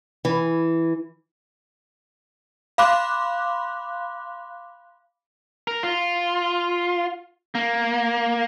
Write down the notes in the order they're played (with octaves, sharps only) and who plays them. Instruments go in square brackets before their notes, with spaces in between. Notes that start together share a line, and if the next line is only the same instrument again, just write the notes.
[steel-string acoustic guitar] E3
[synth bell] F5 B5 C6 D6 F#6
[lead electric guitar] A#4
F4
A#3